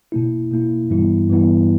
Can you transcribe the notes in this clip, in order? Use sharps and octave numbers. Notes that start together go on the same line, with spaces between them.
B2 A#3 E4
B2 A#3 E4
G2 E3 G3 B3 E4
G2 E3 G3 B3 E4